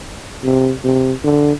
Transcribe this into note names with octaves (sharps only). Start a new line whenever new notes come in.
C3
C3
D3